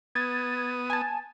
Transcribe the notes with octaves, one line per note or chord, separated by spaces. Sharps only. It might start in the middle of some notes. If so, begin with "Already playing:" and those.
B3 D#6 G#6 A6
G#5 A5